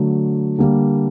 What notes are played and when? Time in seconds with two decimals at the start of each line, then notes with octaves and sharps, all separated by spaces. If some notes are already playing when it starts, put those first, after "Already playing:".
Already playing: D3 F#3 A3
0.58 D3 G3 A#3